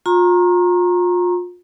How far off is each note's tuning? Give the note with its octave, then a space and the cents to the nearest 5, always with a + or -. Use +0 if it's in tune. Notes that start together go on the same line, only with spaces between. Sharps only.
F4 +30 A#5 +0 C#6 -45